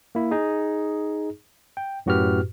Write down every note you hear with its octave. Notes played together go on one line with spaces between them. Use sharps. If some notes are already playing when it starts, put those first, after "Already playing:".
A#3 E4
D#4 G#4
G5
F#2 A2 F#4 G4 B4 F6